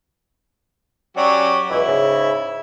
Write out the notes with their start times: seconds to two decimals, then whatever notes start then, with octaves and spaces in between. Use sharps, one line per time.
1.17 F#3 C#4 F#4 G4 D5
1.70 C#2 B2 E3 E4
1.87 G#2 C#3